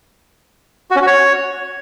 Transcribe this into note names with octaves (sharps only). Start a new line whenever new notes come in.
F#4
C#4
F#4
C#5